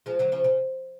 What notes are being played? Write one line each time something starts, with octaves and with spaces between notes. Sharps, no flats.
F3 G#3
D3 F#3
C#3 F3
C#3